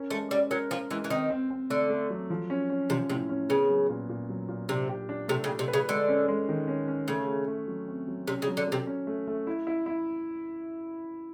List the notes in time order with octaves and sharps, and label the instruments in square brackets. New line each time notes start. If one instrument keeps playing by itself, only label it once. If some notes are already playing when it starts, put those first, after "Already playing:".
Already playing: [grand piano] C#4 A#4
[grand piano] G#3 [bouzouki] A3
[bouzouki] G3 [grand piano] C#4
[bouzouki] F#3 [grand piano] A#4
[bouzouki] F3 [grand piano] A#4
[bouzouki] E3 [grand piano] G#3
[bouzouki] E3
[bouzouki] D#3 [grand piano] C4
[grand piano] C4
C4
[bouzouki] D3 [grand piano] A3
[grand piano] A3
F#3
F3
C#4
C#4
[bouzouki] C3 [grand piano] F3
[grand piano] A2 [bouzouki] C3
[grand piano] C#4
[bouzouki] C#3 [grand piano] B3
[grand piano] F#3
A#2
A#2
F#3
A#2
[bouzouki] C3 [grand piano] D4
[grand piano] G4
D4
[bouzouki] C3 [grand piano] A3
[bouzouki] C#3
[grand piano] G4
[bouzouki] C3
[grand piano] B4
[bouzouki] C#3
[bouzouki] D3 [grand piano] G#3
[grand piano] C#4
G#3
D#3
C#4
C#4
[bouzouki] C#3 [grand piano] A3
[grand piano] A3
A3
F#3
C4
F#3
[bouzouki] C3 [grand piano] C#4
[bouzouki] C#3
[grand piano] F#3
[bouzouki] D3
[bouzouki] C3 [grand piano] F#3
[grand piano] C#4
A3
A3
E4
E4
E4